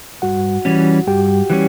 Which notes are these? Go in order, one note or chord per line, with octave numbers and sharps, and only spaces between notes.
G2 F#4 F#5
E3 G3 C#4
G2 G4 G5
E3 G3 C#4